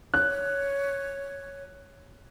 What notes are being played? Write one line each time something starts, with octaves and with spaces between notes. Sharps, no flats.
C#5 F#6